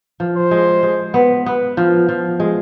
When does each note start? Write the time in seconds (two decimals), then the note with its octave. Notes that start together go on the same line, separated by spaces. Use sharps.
0.20 F3
0.36 C5
0.51 G#3
0.83 G#3
1.14 B3
1.46 B3
1.77 F3
2.09 F3
2.40 G#3